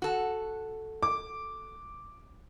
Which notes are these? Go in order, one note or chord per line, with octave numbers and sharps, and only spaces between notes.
F#4 A4
D6